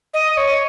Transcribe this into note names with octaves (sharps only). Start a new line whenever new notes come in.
D#5
C#5